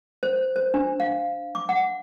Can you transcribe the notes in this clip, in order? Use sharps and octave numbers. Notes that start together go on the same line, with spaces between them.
C5
C5
D4
F5
D6
F#5